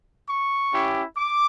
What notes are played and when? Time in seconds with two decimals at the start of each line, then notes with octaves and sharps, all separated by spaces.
0.28 C#6
0.73 C#4 E4 G4
1.17 D6